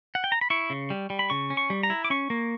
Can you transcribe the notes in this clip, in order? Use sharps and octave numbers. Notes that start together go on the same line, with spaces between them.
F#5
G5
A#5
B5
E4 C#6
C#3
G3
G3
B5
C#3 C#6
C#4
C#6
G3
A#5
E4
D6
C#4 C#6
A#3